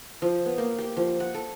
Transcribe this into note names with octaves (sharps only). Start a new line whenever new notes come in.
F3
B3
A#3
G4
F3
F#5
A4